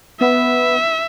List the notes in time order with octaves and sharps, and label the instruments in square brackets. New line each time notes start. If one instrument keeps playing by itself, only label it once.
[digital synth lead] B3 [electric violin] E5